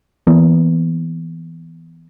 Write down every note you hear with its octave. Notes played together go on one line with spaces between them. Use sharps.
E3 A#3 B3